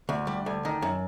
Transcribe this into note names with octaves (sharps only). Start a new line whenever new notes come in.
D2
G3
D2
D#3
F#2